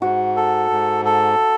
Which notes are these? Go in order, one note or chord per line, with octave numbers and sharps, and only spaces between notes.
G#2 F#4
A4
G#2
A4